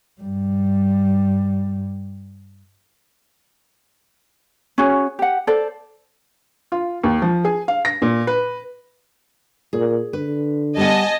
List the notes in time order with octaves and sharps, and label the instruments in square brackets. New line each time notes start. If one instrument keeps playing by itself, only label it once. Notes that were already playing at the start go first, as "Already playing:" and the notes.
[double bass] G2 G3
[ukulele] C#4 F#4 G#4 C#5
G4 F#5
A4 C5 D5
[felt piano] F4
D#2
F3
G#4
F5
A#6
A#2
B4
[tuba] A#2 [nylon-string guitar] G#4
[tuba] D3 [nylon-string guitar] B4
[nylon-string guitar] G3 B3 F#5 [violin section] D#5 G#5 A5